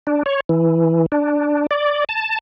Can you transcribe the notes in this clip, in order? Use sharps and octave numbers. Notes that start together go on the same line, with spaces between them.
D4
C#5
E3
D4
D5
A5